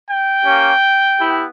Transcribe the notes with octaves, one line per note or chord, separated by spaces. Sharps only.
G5
A#3 C#4 G4
B3 E4 G4